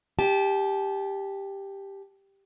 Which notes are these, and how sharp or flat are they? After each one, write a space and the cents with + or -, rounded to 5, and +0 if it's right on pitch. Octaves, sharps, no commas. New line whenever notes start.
G4 +5 A5 -30